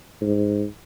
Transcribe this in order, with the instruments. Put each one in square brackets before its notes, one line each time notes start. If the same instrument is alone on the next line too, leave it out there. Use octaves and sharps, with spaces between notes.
[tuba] G#2